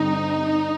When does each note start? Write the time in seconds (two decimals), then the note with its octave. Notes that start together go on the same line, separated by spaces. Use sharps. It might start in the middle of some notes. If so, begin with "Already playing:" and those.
Already playing: G2 D3 G3 C4 D#4